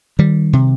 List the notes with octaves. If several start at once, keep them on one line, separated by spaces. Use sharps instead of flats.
D#3 G3
C3